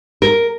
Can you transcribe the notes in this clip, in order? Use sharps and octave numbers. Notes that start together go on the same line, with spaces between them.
A#4